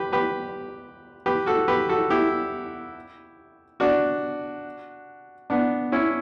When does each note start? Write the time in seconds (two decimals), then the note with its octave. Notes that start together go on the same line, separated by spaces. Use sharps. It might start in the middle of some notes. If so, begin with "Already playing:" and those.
Already playing: G4 B4
0.13 G4 B4
1.26 G4 B4
1.46 F#4 A4
1.68 G4 B4
1.89 F#4 A4
2.10 E4 G4
3.80 D4 F#4
5.50 B3 D4
5.92 C#4 E4